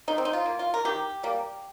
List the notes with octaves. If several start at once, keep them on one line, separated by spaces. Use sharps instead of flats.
D#3 D#4
C4
D#4
F4
A#3
F4
A#4
D#3 G4
G3 A#3